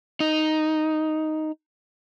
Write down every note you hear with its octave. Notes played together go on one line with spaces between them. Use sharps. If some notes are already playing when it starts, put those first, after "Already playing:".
D#4